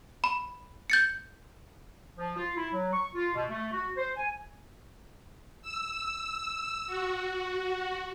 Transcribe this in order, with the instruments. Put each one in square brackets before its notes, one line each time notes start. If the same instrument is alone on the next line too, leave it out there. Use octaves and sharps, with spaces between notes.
[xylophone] B5
G6 A6 C#7
[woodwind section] F3
F4
E4
F#3
C#6
F4
B2
A3
F#4
C5
G#5
[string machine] E6
F#4